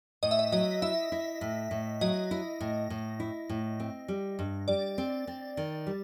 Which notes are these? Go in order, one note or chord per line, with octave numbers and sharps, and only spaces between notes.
A2 D#5
E5
D#5
F#3 D#5
E4 E5
E4
A2
A2
F#3 D#5
E4
A2
A2
E4
A2
C4
G3
G2
G3 D5
C4
C4
D#3
G3